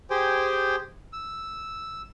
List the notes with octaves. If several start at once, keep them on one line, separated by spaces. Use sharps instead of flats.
G4 G#4 C5 G5 G#5
E6